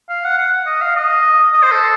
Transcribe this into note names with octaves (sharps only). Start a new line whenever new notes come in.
F5
F#5
F#5
D#5
F5
D#5
D#5
C5
A4